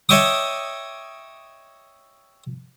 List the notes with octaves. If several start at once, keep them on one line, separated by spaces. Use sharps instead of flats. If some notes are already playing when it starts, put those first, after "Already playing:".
C#5 D#5 E5 G5 D6 D#6